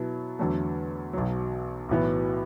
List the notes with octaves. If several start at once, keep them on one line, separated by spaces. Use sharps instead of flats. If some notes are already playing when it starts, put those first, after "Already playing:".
Already playing: B2 F#3 B3 E4
E2 D3 F#3 A3
B1 B2 F#3
B1 A2 E3 B3 F#4